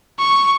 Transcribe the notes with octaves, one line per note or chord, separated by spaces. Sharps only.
C#6